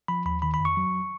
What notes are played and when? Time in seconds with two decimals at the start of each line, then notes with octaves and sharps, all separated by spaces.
0.08 F3 B5
0.25 D#2 B5
0.42 D#3 B5
0.54 B5
0.60 F2
0.65 C#6
0.77 F#3